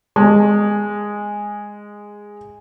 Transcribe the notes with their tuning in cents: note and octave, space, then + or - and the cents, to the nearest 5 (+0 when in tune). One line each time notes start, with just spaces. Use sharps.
G#3 -10